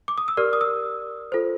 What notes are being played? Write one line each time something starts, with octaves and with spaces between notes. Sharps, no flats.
D6
D#6
E6
G4 A#4 D5 F6
D#6
E6
F4 A4 C5